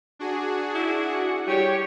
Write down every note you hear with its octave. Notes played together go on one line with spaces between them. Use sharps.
D4 F#4 G#4
E4
F#5
G3 G4 C#5